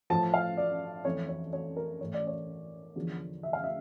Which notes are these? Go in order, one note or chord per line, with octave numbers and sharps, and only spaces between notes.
A2 F3 A5
F5
D5
F2 E3 C#5
C#5
C#5
A#4
A2 E3 C#5
D5
C#5
E2 D3 F3
E5
F5
E5